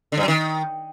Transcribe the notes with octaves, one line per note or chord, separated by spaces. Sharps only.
D3
G2
F#3
D#3